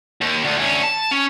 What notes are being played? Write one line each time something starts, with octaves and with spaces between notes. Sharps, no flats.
D#2
D2
D2 C#4
A5
C#4